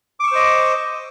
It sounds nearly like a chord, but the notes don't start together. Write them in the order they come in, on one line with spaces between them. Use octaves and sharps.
D6 C#6 E6 C5 D#5